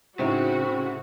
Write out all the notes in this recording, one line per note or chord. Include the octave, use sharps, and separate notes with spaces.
A2 C#3 C4 D#4 F#4